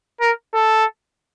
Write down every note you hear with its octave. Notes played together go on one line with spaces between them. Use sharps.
A#4
A4